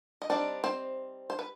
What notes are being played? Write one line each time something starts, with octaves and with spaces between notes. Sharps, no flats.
D#5
G3 C4 D4 D#4 D5
C4 C5
C5
B4